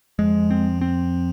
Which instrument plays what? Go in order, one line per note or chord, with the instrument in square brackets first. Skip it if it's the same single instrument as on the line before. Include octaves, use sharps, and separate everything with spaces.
[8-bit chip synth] F2 F3 [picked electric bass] G#3
[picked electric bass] C4
C4